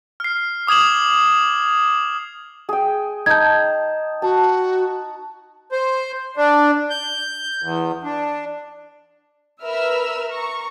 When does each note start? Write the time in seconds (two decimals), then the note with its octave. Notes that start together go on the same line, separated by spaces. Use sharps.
0.20 F6 C7
0.67 D6 D#6 G#6 E7 F#7
2.69 G#4 G5
3.26 D#4 A5 G6 G#6
4.22 F#4 A5
5.72 C5
6.37 D4
6.90 G6
7.62 E2
8.04 D4
9.64 A#4 B4 E5 B5 E6 F6
10.29 A#5 C#6